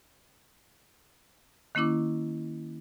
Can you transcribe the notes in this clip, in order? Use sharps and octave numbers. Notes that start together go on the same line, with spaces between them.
D#3 A#3 C#4 E4 D6